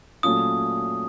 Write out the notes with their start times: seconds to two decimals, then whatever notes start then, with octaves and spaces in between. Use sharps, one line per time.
0.23 A#2 F#3 A3 C#4 F4 D#6